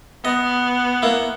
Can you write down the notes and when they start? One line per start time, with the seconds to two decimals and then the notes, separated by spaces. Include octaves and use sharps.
0.25 B3 D#5
1.02 A#3 E4